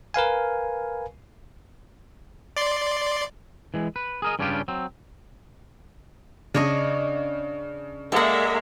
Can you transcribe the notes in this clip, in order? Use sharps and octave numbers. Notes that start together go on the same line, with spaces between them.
A#4 B4 F5 G#5
D5 C6
E3 G#3
B4
G#4 A#4 D#5
G2 C#3 C#4 D4 F4 G4
F#3 C4
C#3 D4 C#5 D#5
G#3 A#3 A4 A#4 D5 E5 F#5